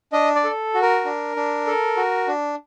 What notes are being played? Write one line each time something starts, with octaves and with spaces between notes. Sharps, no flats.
D4 D#5
D5
A4
F#4
A#4
D4
D4
A4
F#4
D4